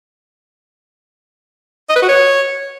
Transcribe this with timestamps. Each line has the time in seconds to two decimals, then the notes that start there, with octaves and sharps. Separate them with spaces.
1.90 D#5
1.96 B4
2.02 F#4
2.09 C#5